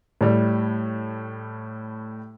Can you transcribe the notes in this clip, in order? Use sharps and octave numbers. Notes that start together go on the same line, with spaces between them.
A2 G3